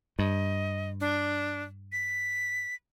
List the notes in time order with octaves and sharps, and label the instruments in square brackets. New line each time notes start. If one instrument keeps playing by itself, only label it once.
[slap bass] G2 [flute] D#5
[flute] D4
B6